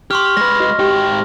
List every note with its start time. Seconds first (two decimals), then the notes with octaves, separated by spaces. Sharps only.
0.11 G4 C6 C#6 F6
0.37 G#3 B4 A#6
0.60 F#4 D#5
0.79 G#2 G4 G5